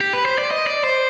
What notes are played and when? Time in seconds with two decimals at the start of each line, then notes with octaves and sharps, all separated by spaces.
0.01 G4
0.13 B4
0.25 C5
0.38 D5
0.51 D#5
0.67 D5
0.84 C5